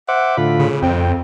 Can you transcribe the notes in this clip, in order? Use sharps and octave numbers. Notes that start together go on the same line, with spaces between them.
C5 E5 F#5 D6
A2 D3 F4 B5
C#3
F2 C4 G5